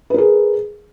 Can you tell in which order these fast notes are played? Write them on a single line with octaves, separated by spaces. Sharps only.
B4 A#4 G#4